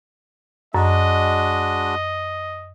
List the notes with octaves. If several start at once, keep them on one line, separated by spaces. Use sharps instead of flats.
F#2 G#3 D4 F#4 D#5